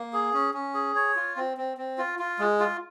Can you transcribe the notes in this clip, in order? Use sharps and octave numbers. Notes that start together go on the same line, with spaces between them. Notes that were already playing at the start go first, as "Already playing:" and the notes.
Already playing: A#3
G#4
C#4
C#4
G#4
C#5
F4
C4
C4
C4
F4
F4
G#3
F4